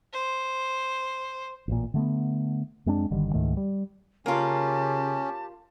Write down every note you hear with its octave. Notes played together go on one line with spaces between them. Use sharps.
C5
A1 A#2
D3 A3 B3
F#2 G#3 C4 D4
G1 D3 D#3 G3
C#2 G#2 D#3 A3
G3
C#3 A#3 C#4 F4 G4 A5